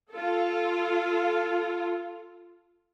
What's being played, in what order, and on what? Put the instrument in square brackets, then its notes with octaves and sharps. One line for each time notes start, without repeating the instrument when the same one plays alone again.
[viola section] F4 A4